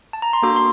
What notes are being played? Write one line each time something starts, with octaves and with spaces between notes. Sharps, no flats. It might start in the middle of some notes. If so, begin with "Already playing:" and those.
A5
A#5
C6
A#3 D4 F#4 A4 D6
C6